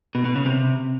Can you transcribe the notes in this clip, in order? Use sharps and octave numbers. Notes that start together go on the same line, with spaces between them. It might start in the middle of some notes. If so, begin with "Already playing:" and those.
B2
B2
C#3
C3